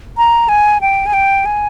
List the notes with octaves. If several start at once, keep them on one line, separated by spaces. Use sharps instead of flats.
A#5
G#5
G5
G#5
G5
G#5